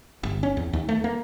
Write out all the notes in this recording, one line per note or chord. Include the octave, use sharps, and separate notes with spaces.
G1
C#4
E2
D#2
A3
A#3